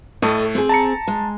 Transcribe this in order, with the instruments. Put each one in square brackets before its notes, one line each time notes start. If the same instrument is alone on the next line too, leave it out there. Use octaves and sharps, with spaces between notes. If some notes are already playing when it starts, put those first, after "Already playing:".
[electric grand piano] A2 A3 [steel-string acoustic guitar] A4 D#5
[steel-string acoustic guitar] C4 G#4
[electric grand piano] A5 A#5 C#7
[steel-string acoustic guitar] G#3